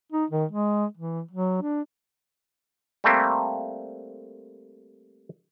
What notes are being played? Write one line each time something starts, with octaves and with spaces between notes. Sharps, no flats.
D#4
D#3
G#3
E3
F#3
D4
G3 A3 A#3 C4